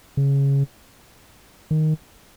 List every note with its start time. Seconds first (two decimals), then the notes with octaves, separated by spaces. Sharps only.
0.17 C#3
1.71 D#3